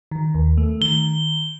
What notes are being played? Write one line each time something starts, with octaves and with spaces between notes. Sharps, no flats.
D#3
D#2
A3
D#3 G7